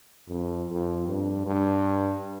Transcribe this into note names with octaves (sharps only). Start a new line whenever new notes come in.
F2
F2
G2
G2